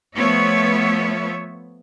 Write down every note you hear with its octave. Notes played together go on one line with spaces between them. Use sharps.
F3 A3 B3 C#5 E5